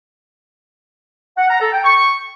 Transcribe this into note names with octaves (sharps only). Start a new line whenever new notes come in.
F#5
A#5
A4
G5
C#6